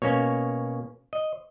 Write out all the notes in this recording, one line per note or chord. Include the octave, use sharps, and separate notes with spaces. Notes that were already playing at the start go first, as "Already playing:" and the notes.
B2 A#3 C#4 C#5
D#5